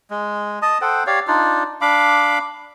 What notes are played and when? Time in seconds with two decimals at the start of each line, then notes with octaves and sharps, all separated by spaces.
0.11 G#3
0.62 D#5 A5 D#6
0.81 A4 C5 F#5 G5
1.07 G4 C#5 D5 F5
1.27 D4 D#4 F4 D5
1.81 D4 F5 B5 D6